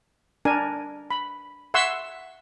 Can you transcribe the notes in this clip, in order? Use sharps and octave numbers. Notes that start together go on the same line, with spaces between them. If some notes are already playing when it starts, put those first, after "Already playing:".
D4 A#4 G#5
B5
E5 F#5 C6 C#6 E6